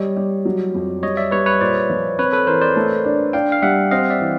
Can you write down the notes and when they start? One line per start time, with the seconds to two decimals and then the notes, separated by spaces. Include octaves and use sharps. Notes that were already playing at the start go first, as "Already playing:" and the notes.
Already playing: G3 C#5 D#5
0.17 G3
0.45 F#3
0.74 F2
1.03 G3 C#5 D#5
1.17 D5 E5
1.31 G3 B4 C#5
1.46 B4 C#5
1.61 A#2 C5 D5
1.90 F3
2.18 C4 B4 C#5
2.33 A4 B4
2.47 E3 A#4 C5
2.61 C5 D5
2.76 A3
3.05 D4
3.33 D4 F5 G5
3.52 F5
3.62 G3 E5 F#5
3.91 C4 D#5 F5
4.10 D5 E5
4.20 E3